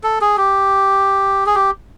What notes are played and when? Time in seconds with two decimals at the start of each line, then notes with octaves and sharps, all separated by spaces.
0.04 A4
0.21 G#4
0.38 G4
1.46 G#4
1.55 G4